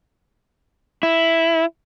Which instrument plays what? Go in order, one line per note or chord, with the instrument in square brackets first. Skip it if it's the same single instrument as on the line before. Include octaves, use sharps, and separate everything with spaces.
[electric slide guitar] E4